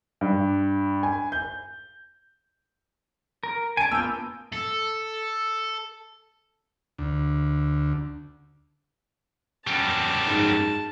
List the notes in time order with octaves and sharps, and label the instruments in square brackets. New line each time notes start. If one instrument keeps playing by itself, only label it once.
[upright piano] G2
G#5
G6
[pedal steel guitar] A#4
[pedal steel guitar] G#5 [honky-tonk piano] A5 D7
[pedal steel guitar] A#3 B3 F4 [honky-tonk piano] E6 G6
[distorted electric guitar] A4
[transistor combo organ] D2
[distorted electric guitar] F#2 G3 [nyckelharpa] A5
[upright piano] G#2